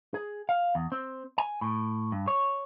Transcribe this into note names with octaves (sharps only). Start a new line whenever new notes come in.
G#4
F5
E2
C4
G#5
A2
G2
C#5